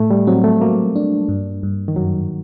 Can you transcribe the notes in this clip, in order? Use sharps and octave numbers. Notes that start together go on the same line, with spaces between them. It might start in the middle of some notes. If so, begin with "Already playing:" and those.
Already playing: A2 A3
G3
F#3 C4
A3
F#3 A#3
D4
G2
G2
D#3
F#2 F#3